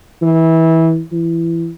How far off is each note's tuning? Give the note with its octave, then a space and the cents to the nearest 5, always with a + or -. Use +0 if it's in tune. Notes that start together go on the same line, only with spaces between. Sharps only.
E3 -20
E3 +15